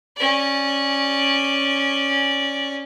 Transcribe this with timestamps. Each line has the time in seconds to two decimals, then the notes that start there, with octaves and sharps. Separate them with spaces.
0.17 C#4 D5